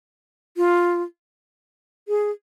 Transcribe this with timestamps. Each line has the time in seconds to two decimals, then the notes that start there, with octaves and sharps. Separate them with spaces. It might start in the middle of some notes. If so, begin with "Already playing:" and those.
0.57 F4
2.08 G#4